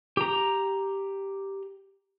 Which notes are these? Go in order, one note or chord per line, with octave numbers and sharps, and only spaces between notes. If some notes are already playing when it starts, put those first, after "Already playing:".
G4 A#5